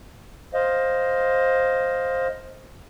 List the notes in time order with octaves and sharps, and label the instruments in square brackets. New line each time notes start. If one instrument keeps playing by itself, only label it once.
[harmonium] C5 D#5 F5